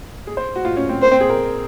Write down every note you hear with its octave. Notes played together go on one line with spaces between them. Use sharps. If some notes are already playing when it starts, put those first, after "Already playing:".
G#4
C5
F#4
F4
C#4
C4
A#3 C5
C4
G#4
A#4